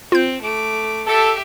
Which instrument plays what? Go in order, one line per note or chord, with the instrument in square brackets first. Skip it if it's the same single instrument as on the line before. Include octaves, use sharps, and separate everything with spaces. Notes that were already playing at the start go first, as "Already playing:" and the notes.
[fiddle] C4 [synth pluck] F4 G6
[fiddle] A3 D6
[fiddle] G4 E5 [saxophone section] A4